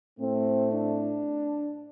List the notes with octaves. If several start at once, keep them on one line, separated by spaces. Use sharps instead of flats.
A2 A3 C4
D4